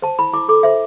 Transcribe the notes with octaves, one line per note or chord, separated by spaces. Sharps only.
C5 A5
E4 B5
E4 D6
A4 D6
C5 E5